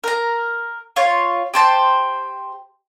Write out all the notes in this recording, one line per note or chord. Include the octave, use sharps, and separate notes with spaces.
A#4 A#5
F4 C#5
G4 C5 A5